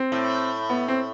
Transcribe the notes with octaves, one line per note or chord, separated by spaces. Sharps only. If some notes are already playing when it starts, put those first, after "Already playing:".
Already playing: C4
A2
B3
C4